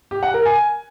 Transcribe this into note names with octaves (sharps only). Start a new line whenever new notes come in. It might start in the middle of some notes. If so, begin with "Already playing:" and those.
G4
F#5
A#4
G#5